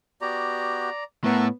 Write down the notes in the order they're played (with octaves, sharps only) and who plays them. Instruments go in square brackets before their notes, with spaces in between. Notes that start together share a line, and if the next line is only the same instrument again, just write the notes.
[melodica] B3 F#4 G4 [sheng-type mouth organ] D5 A#5
[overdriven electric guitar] A2 [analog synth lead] B3 [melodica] A#4 F#5 [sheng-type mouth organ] E5 A5 C#6